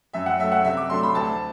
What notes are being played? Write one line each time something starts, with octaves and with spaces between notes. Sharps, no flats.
F#2 E5
F#5
F#3 A3 E5
F#5
C3 E5
D6
F#3 A3 D4 C6
B5
D2 A5